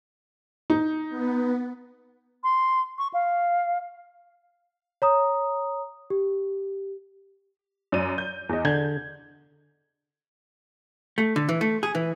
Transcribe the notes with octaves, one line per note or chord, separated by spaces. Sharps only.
D#4
B3
C6
C#6
F5
C#5 A#5 D#6
G4
F#2 D5 D#7
G6
E2 D#5
D3 G6 G#6
A3
D3
E3
A3
G#4
E3